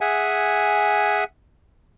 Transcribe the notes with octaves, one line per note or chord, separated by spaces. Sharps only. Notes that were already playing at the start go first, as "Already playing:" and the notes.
G#4 E5 F#5 G#5